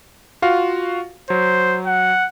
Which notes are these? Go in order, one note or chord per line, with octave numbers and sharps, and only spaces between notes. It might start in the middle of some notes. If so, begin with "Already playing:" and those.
F4 F#4 F5
F#3 C5
F#5